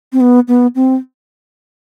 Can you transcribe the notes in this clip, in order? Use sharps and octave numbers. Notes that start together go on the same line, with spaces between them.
C4
B3
B3
C4